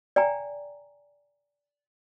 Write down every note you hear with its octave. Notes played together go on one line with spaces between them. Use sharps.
D5 G5 G#5 A#5